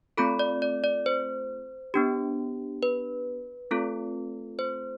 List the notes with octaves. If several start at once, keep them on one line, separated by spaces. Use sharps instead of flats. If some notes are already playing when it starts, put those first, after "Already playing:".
A3 C4 F4 A4 B5
D5
D5
D5
C5
B3 D4 G4
B4
A3 C4 F4 A4
C5